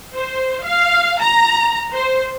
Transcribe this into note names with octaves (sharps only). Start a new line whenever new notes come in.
C5
F5
A#5
C5